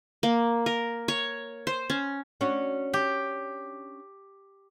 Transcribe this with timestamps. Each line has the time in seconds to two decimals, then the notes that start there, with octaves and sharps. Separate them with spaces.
0.23 A#3
0.66 A#4
1.08 C#5
1.67 C5
1.90 C#4
2.41 C#4 D4 F#4
2.94 G4